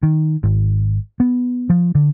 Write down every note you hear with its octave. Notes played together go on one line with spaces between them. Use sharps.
D#3
G#1
B3
F3
D3